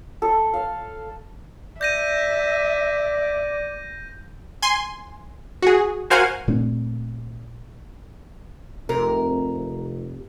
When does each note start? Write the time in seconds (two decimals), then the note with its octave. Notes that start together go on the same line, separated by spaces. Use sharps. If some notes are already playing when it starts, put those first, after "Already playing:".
0.22 A4
0.53 F5
1.81 D5 E5 G6 A#6 D#7
4.62 G#5 C6
5.62 F#4 G#4
6.10 F#4 A#4 C5 F5 F#5 G#5
6.48 A#2 A3 C4 D4
8.89 F1 C3 A#4